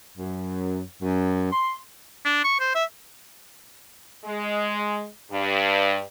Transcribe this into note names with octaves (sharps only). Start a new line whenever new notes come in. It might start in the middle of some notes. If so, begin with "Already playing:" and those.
F#2
F#2
C6
D4
C#6
C5
E5
G#3
G2